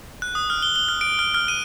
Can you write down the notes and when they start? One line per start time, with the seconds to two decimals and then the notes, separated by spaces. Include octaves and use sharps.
0.22 F#6
0.35 D#6
0.50 F6
0.63 G7
0.76 G7
0.89 F6
1.01 D7
1.19 F6
1.34 F6
1.48 D#7